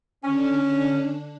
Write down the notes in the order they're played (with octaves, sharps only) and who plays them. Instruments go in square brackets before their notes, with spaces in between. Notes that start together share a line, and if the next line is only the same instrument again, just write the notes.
[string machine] D3 D4 [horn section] C#4